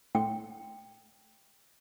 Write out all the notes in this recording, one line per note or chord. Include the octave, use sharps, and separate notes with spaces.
A2 G5